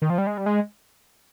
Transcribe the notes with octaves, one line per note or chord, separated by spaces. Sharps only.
D#3
F3
G3
G#3
G3
G#3